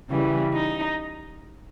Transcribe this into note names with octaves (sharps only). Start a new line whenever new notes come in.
C#3 E3 G3
D#4